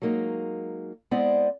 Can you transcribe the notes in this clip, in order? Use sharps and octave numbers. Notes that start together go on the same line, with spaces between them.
F#3 G#3 A#3 D#4
G#3 B3 C4 E4 D5 D#5